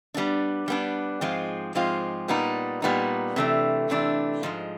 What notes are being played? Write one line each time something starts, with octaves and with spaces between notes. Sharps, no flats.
G3 B3 D4
G3 B3 D4
G#2 F3 G#3 C4 F4
G#2 F3 G#3 C4 F4
A#2 G3 B3 D#4
A#2 G3 B3 D#4
C3 E3 A3 D4
C3 E3 A3 D4
G#2 F3 G#3